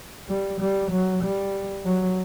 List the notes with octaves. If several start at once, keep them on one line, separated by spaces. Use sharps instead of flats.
G3
G3
F#3
G3
F#3